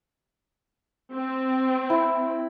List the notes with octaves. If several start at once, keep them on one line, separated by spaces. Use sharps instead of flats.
C4
E4